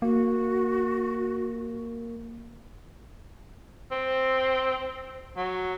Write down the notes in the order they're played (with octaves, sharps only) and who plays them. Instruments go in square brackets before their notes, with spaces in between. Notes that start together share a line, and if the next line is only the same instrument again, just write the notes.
[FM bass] A#3 [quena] F#4
[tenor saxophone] C4
F#3